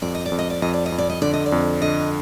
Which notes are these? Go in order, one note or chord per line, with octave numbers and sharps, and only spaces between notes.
F2 D5
D#5
D5
F2
D#5
D5
F2 D#5
D5
D#5
F2
D5
D#5
D3 D5
D#5
D5
F2
D3 D#5